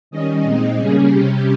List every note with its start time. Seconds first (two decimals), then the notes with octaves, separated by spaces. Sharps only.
0.11 D#3 G3 C#4 D#5
0.43 A#2 G#3 C4 D#4
0.77 C#3 G3 A#3 C#4 G#4
1.10 C3 G3 C#4 G4